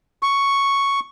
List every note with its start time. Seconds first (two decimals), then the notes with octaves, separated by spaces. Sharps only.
0.22 C#6